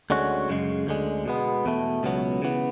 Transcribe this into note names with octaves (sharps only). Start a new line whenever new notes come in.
D2 D3 G#3 C#4 F#4
F#2 C#3 G#3
D2 D3 G#3
B2 G#3 B3
E2 B2 A3
C#2 B2 F#3 B3
C#3 E3 B3